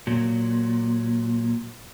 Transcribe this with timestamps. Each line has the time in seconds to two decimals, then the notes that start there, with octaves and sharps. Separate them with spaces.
0.07 A#2 F#3